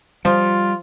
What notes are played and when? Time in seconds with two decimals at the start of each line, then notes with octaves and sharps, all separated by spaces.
0.25 F3 G3 F4